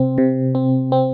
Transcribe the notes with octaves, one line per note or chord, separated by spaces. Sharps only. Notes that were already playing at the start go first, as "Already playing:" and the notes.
Already playing: C3 C4
C3
C4
C4